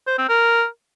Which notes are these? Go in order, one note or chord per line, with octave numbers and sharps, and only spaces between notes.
C5
C4
A#4